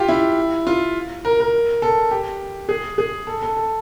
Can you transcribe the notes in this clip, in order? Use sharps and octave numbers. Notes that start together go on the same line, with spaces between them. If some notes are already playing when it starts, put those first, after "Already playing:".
Already playing: F4 G4
E4
F4
A#4
A#4
A4
G4
G#4
G#4
A4
A4
A4